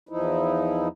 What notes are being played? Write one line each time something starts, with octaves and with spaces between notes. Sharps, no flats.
E2 F3 D#4 E4